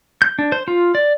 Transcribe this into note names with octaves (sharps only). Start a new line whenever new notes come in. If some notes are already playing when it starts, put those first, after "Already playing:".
G6
D4
C5
F4
D5